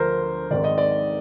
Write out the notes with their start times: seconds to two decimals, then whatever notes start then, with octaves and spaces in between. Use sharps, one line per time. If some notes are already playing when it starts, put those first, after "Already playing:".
Already playing: D2 D3 F3 A#4 C5
0.51 G#1 G#2 D#3 D5
0.64 D#5
0.78 D5